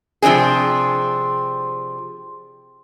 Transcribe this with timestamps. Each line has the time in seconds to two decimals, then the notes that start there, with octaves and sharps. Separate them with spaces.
0.22 C3 F3 C4 D4 G#4